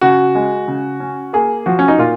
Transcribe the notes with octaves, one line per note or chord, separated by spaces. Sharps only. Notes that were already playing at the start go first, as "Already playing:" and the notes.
C#3 F#4
G#3
C#3
C#4
A#3 G#4
F3 F#4
C#4
D#4
A#2 F4